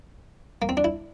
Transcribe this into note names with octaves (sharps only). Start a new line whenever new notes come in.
A#3
C4
D4
E4